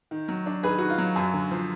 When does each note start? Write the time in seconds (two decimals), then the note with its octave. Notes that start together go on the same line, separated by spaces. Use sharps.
0.11 D#3
0.28 F#3
0.46 D4
0.63 D#3 G#4 B4
0.78 D#3 F#4
0.90 F4
0.98 F#3
1.16 F#2
1.33 D3
1.51 F3